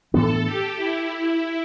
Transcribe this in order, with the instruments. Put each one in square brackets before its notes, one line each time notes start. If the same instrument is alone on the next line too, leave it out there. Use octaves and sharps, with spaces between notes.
[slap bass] A2 E3 B3 D4 [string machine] A4
[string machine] G4
E4